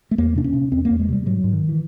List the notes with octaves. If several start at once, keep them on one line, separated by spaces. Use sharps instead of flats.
A3
E2 A#3
C3 D4
C#4
C3
E2 C4
A#3
E2
G#3
C3 G3
G#2 F#3
G#2
D#3
E3